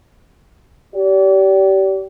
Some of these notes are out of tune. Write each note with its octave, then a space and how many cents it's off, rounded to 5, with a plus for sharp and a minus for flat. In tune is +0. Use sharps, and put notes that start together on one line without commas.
G4 -25 D5 -35